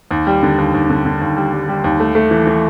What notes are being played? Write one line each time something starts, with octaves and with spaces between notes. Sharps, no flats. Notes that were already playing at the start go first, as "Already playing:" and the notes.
D#2
G3
D3
D#2
D#2
D3
D3
D#2
G3
G3
G3
D#2
A3
A3
E3
E3